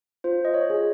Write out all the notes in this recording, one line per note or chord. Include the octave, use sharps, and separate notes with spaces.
F4 C5
D#5
C#5
G#4